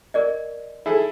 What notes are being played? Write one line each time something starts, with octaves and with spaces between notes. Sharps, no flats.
A#4 D5 D#5
E4 G#4 A4